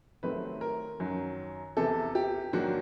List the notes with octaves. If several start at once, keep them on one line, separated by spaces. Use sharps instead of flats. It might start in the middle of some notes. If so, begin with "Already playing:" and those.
C3 D#3 F#3 A3 C4 B4
A#4
F#2 D#3 F#3
E2 C3 E3 A4
G4
G#2 D#3 F#3 A#3 D4 F#4